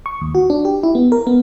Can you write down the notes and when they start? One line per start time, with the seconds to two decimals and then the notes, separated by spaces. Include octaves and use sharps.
0.06 C#6
0.21 D#2
0.35 F#4
0.50 D4
0.65 G4
0.83 E4
0.95 B3
1.12 A#4
1.27 B3